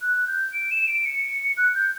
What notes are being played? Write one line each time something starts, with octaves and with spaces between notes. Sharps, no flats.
F#6
G6
D7
E7
D7
C#7
F#6
G6